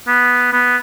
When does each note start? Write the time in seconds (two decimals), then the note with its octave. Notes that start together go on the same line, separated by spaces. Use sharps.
0.08 B3
0.53 B3